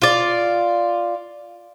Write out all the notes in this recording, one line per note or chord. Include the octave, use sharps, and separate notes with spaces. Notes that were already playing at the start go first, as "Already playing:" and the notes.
F4 D5